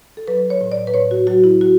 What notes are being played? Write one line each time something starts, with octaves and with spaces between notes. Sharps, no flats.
A4
F#3 B4
C#5
A2
D5
B4
A2 C#5
F#4
F#3 F#4
E4
F#4